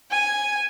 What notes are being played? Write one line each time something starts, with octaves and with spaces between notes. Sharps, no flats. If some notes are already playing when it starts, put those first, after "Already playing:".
G#5